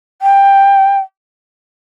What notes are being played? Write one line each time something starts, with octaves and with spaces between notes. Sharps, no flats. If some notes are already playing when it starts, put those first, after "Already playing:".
G5